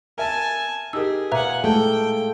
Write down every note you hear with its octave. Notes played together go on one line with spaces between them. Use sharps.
A#4 E5 G#5 A5
D#4 G4 G#4 A#4 E6
A#2 B4 E5 F#5 G#5 A#5
G#3 A3 A4 G5